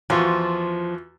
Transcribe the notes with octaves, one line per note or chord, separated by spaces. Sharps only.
E2 F3 F4 F#4